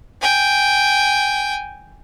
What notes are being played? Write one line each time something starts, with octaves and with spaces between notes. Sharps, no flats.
G5 G#5